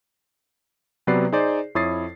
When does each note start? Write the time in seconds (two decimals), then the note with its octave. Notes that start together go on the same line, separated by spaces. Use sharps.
1.07 C3 F#3 B3 B4 D5 C7
1.32 D#4 G#4 C5 D5
1.75 F2 E4 C#5 D#6 A6 C7